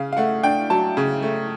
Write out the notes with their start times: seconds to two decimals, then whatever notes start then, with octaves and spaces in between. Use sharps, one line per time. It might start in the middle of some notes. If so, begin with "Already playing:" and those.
Already playing: C#3 F5
0.13 F5
0.17 A3 F#5
0.43 D4 G5
0.70 F#3 A5
0.97 C#3
1.22 A3